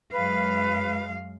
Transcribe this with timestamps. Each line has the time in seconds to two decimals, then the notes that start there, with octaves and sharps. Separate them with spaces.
0.12 F#2 G#3 B4 F5